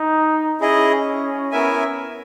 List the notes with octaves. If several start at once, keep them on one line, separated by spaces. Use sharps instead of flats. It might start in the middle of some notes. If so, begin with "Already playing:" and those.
Already playing: D#4
C#4 E4 G#4 D#5
B3 E4 A#4 E5 G#5